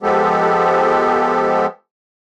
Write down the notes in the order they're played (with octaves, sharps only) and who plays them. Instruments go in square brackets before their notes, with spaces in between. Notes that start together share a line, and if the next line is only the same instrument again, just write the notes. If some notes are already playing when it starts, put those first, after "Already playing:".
[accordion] F3 G#3 B3 G4 A4